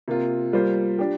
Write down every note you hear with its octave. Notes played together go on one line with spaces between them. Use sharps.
C3 A#3 F4
G3 A#3 F4 C5
D4 G4